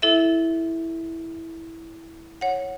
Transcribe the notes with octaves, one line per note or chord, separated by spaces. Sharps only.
E4 A4 E5
C#5 F#5